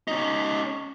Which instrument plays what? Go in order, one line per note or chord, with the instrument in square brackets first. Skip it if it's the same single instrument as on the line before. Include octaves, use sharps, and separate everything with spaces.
[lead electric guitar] C#4 D#4